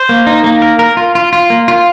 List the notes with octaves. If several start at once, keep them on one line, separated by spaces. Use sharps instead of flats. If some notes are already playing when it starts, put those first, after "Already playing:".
Already playing: C5
A#3
D#4
A#3
A#4
A#4
F4
F4
F4
A#3
F4